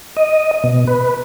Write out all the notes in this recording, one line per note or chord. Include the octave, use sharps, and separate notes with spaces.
D#5
B2
B4